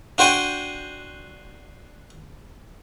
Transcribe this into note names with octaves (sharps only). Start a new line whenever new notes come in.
D4 F#4 C5 G5 G#5